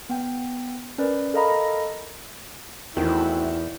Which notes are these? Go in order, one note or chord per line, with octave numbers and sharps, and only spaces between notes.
B3 G5
C#4 A#4 B4 D5
A4 A#4 D#5 F5 A#5 B5
E2 D#3 A3 C4 E4 F#4